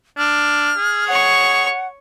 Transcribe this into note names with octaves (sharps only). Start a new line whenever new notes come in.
D4 F6
G#4
C#5 F#5 C#6